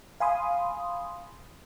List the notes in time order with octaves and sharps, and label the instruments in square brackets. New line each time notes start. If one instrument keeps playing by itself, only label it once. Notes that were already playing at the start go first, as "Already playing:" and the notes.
[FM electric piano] F5 G#5 B5 C6 D#6